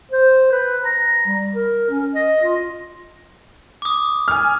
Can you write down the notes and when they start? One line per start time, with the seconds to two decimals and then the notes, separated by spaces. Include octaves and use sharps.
0.11 C5
0.52 B4
0.85 A#5
1.26 G3
1.54 A#4
1.90 C#4
2.15 D#5
2.43 F4
3.82 D6 D#6
4.28 G#5 F6